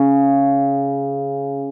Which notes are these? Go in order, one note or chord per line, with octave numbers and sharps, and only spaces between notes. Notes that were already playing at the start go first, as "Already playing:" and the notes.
Already playing: C#3